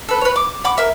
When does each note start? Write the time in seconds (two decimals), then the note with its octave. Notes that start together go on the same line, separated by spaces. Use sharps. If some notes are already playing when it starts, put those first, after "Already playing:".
0.09 A4 B4
0.21 B4 C#5
0.36 D6
0.64 F#5 B5 D6
0.78 A#4 E5